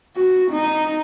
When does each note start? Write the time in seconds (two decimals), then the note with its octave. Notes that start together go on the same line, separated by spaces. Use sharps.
0.16 F#4
0.51 D#4